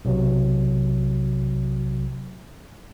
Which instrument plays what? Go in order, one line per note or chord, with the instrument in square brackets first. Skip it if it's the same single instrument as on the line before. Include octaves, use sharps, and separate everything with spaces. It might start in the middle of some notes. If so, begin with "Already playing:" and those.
[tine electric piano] B1 C3 F#3